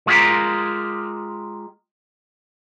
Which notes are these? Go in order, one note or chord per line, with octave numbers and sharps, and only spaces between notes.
G#3 F4 G4 A#4